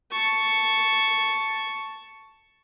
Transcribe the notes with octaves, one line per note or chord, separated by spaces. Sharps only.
A5 C#6